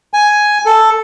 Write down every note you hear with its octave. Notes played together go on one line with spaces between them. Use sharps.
G#5
A4